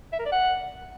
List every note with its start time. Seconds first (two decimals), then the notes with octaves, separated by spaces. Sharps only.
0.13 E5
0.19 A#4
0.26 D5
0.32 F#5